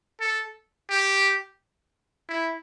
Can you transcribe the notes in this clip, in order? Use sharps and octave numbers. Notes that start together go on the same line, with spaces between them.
A4
G4
E4